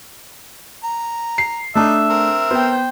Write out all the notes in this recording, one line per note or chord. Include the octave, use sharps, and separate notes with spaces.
A#5
C7
A3 D4 D#4 E5
C4 A#4
B3 C5 G5